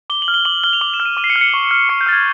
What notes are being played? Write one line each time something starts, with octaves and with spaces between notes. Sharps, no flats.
D6 G7
F#7
F6
G7
D6 F#7
F6 G7
F7
D6 F#7
E7
F6
D#7
D6 D#7
C7
C#7
F6
C#7
C#6
F6
C#6 C#7
G6
F6 A6
G#6